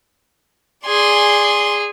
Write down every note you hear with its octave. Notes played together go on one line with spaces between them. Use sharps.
G#4 D5 G#5 C6